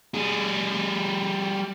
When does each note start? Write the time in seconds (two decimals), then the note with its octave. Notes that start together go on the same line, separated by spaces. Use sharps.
0.14 G3 G#4